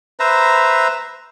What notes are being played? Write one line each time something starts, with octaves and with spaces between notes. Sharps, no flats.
B4 C5 E5 A#5